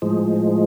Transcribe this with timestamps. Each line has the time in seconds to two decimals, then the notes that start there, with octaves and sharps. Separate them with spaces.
0.02 A2 F3 G#3